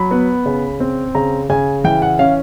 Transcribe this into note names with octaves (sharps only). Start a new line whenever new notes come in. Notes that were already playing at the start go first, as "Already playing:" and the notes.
Already playing: F#3 B5
B3
C#3
C4
C#3 A#5
C#3 G#5
E3 G5
F#5
C#4 F5